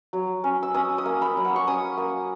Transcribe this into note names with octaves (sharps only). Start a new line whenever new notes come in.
F#3
C#4
E6
C#4 D#6
D#6
A#3
B5
F#3
F#5
C#6
C#4 D#6
A#3